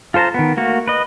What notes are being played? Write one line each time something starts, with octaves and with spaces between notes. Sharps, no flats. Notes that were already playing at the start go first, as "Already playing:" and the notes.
F4 A4 C5 A5 A#5
D#3 B3
A3 A#3 F#4
B4 D#5